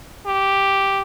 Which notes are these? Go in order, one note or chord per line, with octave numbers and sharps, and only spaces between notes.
G4